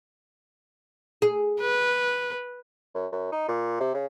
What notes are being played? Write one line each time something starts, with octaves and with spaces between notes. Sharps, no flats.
G#4
B4
F#2
F#2
D#4
A#2
C3
C#3